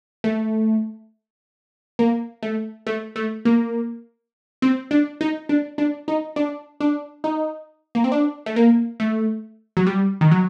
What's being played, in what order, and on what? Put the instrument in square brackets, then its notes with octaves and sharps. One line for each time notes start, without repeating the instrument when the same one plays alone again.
[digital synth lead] A3
A#3
A3
A3
A3
A#3
C4
D4
D#4
D4
D4
D#4
D4
D4
D#4
A#3
C4
D4
A3
A#3
A3
F#3
G3
D#3
F#3